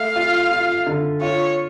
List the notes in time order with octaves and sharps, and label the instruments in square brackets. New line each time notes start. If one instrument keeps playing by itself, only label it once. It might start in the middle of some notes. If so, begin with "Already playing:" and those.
Already playing: [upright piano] A3 [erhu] F5
[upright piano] F4
F4
D3
[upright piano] F4 [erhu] C#5